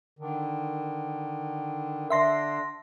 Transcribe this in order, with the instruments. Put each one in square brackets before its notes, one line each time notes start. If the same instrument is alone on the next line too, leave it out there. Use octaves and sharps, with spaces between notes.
[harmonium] D3 D#3
[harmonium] D3 D4 [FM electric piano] E5 C6 A#6